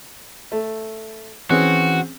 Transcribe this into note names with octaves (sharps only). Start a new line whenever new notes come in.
A3
E3 C4 C#4 F#4 G#4